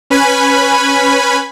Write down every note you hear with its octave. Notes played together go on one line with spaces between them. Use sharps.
C#4 B4 G#5 B5